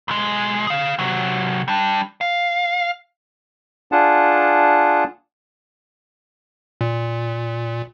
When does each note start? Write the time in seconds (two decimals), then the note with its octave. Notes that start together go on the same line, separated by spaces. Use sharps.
0.08 B1 G#3
0.67 G#4 F5
0.99 C3 F#3
1.68 G3 D4
2.21 F5
3.92 D4 F4 G#4 F#5 A5
6.81 A#2